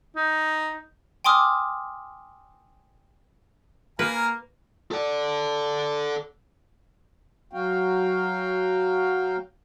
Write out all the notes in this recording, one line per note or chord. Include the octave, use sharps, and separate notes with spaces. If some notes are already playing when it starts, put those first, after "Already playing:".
D#4
G5 G#5 C6 D6 D#6 F6
A#3 B4 F5 G#5 A#5
A4 D5
F#3 F#4 F5 G5